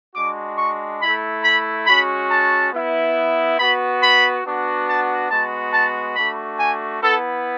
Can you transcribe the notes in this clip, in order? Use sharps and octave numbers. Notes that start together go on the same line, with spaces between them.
G#3 D4 F#4 D6
C#6
A3 E4 B5
B5
G#3 C#4 F#4 B5
A5
B3 E4
B3 F#4 B5
B5
B3 D4 F#4
A5
G#3 B3 F#4 A5
A5
A3 D4 F#4 B5
G#5
B3 E4 A4